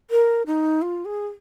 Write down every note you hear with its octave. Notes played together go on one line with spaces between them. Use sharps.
A#4
D#4
F4
G#4